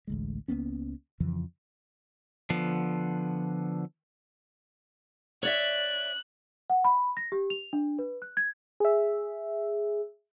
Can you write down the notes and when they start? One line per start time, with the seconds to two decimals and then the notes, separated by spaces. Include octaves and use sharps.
0.07 A1 D2 G#3
0.48 C#2 A#3 B3 C#4
1.20 F2 C#3 E3 F3
2.50 D3 F3 B3
5.43 C#5 D5 E5 F#6
6.70 F#5
6.84 B5
7.17 A#6
7.32 G4
7.50 F7
7.73 D4
7.99 B4
8.22 F#6
8.37 G#6
8.80 G#4 E5